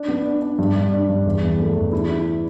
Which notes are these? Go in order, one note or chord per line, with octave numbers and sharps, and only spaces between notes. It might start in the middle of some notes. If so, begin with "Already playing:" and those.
Already playing: D4
B3
D4
D4
G2
G2
D4
G2
E2
E2
A3
E2
E4
E4